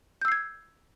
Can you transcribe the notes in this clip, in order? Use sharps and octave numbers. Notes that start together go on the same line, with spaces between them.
E6 G6 G#6 C7